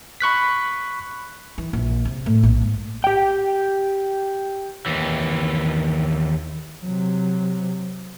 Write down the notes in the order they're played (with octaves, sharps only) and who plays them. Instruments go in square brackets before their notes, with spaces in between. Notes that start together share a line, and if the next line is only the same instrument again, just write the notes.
[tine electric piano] B5 C#6 F#6 B6
[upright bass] E3
A#1
C3
A2
A#1
G#2
[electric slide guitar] G4 G5
[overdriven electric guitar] D#2 E3
[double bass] C3 F#3